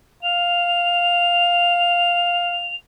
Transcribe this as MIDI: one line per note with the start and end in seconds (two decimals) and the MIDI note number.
0.23 2.76 77
0.23 2.76 101